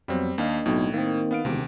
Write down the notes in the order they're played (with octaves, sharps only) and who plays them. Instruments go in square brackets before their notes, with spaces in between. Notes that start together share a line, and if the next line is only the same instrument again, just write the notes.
[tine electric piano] F2 F#3 B3 [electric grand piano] G3 C4
[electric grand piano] D#2 F5 [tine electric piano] A#3 D4 D#5
[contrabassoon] B1 [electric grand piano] A2
[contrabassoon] D#3 [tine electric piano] A#3 C4
[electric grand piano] B3 F5 D7
[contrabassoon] E1 [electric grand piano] D2 [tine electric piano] C3 D#3 C4